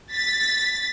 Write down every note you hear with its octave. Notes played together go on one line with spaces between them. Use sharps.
A6 B6